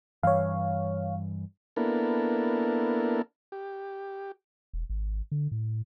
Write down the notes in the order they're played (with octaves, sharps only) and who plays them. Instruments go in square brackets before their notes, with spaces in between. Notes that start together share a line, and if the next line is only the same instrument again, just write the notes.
[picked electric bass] G2 E3 [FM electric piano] C#5 F5
[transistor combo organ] A#3 B3 D4 E4 A4 A#4
G4
[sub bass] E1
G#1
D3
A2